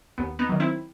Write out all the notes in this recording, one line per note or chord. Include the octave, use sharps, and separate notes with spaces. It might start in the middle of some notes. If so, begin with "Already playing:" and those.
D#2 B3
B3 D#4
D#3 F#3
C4 E4